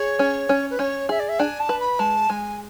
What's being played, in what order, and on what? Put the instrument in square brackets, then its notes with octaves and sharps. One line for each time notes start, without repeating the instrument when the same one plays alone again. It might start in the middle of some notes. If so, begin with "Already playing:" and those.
Already playing: [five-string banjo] G#4 [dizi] C#5
[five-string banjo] C#4
C#4
[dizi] B4
[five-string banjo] C#4 [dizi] C#5
[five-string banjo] G#4 [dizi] E5
[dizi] D5
E5
[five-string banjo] D4 [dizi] G#5
[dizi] A5
[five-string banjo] B4
[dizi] B5
[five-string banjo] G#3 [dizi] A5
[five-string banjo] G#3 [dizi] G#5